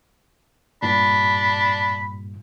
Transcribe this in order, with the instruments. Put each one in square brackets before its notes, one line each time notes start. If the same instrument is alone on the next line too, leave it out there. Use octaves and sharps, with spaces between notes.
[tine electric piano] G2 A#2 [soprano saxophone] D4 [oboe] B5